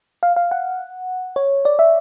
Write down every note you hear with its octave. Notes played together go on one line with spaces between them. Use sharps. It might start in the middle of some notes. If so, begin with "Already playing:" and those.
F5
F5
F#5
C#5
D5
E5